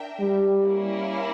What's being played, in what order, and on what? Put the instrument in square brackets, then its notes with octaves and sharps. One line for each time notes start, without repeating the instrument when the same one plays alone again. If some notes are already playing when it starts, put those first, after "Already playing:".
Already playing: [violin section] D4 A#4 E5 G5
[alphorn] G3
[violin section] A#3 C#4 E4